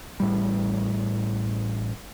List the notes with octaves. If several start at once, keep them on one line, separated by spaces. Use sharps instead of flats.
A1 A2 G3